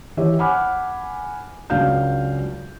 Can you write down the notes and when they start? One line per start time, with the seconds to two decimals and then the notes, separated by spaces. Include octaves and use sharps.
0.17 E3 G4 C#5 E5
0.39 F#5 G#5 B5 D6 F6
1.70 C#2 F#3 D4 F5 G6